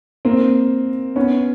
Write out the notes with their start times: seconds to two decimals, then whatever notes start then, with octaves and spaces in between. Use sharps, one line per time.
0.25 A#3 C4
1.16 B3 C#4